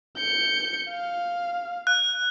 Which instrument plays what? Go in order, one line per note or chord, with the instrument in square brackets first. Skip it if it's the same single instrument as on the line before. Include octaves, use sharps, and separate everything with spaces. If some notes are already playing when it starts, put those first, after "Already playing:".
[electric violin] G6 C#7
F5
[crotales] F#6